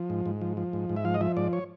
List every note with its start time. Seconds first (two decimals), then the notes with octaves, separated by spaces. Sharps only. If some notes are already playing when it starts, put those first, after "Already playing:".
Already playing: F3
0.10 G#2
0.26 G#2
0.41 F3
0.57 F3
0.73 G#2
0.89 G#2
0.96 E5
1.05 F3 F5
1.14 D#5
1.21 F3 E5
1.37 G#2 D5
1.53 C#5